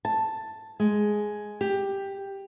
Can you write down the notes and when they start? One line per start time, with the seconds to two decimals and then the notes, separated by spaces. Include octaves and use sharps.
0.05 A5
0.80 G#3
1.61 G4